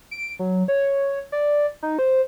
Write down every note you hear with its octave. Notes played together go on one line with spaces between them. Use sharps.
D7
F#3
C#5
D5
D#4
C5